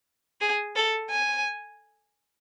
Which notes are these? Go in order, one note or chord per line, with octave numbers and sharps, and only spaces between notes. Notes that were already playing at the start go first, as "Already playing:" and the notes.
G#4
A4
G#5